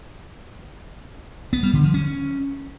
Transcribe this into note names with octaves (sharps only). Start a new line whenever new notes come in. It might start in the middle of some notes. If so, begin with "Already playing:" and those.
B3
G3
D3
F3
C#4